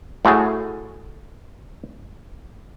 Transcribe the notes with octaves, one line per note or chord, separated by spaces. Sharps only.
A2 A3 F#4 G#4